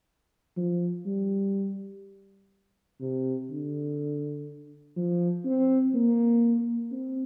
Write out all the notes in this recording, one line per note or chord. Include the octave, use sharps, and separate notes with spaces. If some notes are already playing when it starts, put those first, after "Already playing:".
F3
G3
C3
D3
F3
C4
A#3
C4